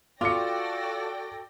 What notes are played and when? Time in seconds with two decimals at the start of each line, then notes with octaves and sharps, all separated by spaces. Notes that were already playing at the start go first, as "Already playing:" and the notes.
0.21 F4 F#4 A4 D5 G5 D6 A#6 C#7